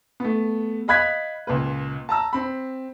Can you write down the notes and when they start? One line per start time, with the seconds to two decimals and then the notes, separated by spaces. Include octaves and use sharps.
0.20 A3 B3
0.88 D#5 F5 B5 F#6 G#6 B6
1.47 C#2 A#2 B4
2.09 A5 A#5 E6
2.33 C4 B5